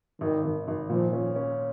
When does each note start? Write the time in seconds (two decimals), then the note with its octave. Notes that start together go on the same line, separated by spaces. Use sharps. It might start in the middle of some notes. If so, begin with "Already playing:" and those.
0.21 G#1 D#3
0.44 G#1
0.68 G#1
0.90 A#2 F3
1.13 C#4
1.36 C#4